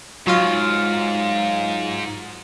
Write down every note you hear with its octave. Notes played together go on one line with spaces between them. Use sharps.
G#2 F#3 F4 F5